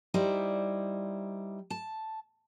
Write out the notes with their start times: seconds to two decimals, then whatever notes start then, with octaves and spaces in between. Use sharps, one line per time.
0.14 G3 D#4 E4 C5 D5
1.70 A5